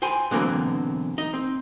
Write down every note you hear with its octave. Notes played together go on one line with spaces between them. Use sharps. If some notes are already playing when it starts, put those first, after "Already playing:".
C5 G5 G#5 B5 C6
B2 D3 E3 F#3 A#3 C4
D#4 D#5
C4